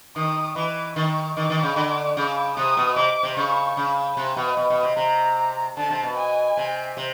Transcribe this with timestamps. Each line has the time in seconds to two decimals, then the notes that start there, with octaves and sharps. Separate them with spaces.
0.16 D#3 D#6
0.56 E3 D6
0.96 D#3 C#6
1.36 D#3 D6
1.50 D#3
1.63 C#3
1.76 D3 D6
2.17 C#3 D6
2.56 C3 D#6
2.77 B2
2.96 C3 D6
3.23 C3
3.37 C#3 C#6
3.77 C#3
4.17 C3
4.36 B2
4.57 B2
4.70 B2
4.83 C3
4.96 C3 A#5
5.77 D3 A5
5.90 C3
6.03 B2
6.17 G#5
6.57 C3
6.97 C3